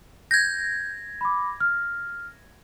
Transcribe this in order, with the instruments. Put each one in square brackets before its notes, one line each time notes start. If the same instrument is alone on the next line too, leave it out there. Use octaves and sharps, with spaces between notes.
[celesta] G6 [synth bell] G#6 A#6
[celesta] B5 D6
F6